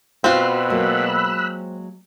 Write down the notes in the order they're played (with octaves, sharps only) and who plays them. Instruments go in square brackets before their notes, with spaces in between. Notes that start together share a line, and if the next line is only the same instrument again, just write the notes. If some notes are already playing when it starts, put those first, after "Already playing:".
[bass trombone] B2 [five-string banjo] C4 F4 [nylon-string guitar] F#4 [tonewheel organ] B5 E6 F#6
[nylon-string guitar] F#3 G#3 A#3